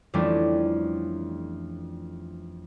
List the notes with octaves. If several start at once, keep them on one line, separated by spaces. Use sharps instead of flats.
F2 E3 G3 A3 C#4 D4